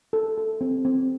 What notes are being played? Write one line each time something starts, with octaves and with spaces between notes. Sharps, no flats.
A4
A4
C4
C4